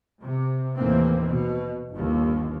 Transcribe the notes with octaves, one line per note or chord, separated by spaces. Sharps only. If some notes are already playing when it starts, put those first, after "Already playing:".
C3
D#2 A2 E3 A#3 C4
B2
G1 D#2